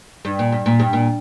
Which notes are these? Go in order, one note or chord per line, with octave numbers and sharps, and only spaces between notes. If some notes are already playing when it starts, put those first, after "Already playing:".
G2
A#2
G2
A#2
G2
A#2